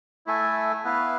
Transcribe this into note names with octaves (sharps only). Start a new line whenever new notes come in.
A3 E4 A4 E5 G#5
B3 E4 B4 F5